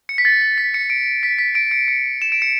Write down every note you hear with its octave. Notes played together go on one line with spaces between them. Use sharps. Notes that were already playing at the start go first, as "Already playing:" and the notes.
C#7
B6
A6
A6
B6
C#7
D7
B6
B6
D7
C#7
C#7
E7
D7
C#7